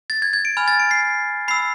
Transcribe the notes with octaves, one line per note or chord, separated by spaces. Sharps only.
A6
G#6
G#6
D7
G#5 B5 F6
A6
D7
C7
B5 E6 C7